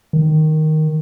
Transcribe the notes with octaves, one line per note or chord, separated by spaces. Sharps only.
D#3